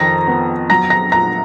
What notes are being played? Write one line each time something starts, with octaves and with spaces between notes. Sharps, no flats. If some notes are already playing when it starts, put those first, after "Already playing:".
Already playing: F2 D#3 A#5 A#6
B3
F#3 A#5 A#6
A#5 A#6
A#2 A#5 A#6